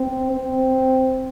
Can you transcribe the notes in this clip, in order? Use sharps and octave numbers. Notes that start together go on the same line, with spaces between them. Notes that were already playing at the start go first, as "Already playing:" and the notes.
Already playing: C4
C4